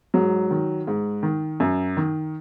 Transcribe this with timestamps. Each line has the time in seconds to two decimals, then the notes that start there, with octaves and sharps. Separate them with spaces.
0.14 G#2 F#3
0.51 D#3
0.87 G#2
1.23 D#3
1.60 F#2
1.97 D#3